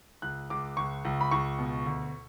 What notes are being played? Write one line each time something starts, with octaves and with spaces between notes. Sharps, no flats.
C#2 F#6
C#2 D6
C#2 C#6
C#2
B5
C#2 C#6
B2
D2